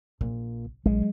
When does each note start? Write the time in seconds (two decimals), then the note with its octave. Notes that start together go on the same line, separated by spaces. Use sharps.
0.21 A#1 A#2
0.86 A#1 F#3 G#3